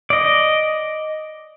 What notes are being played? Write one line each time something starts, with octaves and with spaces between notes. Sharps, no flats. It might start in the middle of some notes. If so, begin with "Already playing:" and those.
D5 D#5